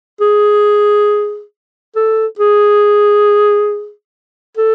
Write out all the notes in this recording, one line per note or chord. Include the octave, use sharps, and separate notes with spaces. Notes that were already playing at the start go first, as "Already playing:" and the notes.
G#4
A4
G#4
A4